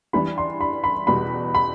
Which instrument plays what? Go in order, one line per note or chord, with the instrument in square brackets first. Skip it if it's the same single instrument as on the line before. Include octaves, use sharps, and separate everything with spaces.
[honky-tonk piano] E3 G3 D4 [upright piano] B5
[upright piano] C6
B5
B5
[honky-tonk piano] E2 B2 G3 B3 F#4 [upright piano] B5
[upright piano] B5